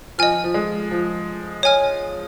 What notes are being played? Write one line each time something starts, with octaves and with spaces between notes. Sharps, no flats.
F3 D#5 G#5 F6
F3
G#3
F3
C#5 G#5 F6